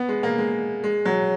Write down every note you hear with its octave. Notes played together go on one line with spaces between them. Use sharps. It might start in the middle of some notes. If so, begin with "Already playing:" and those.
Already playing: B3
G#3
A#3
G#3
G#3
F#3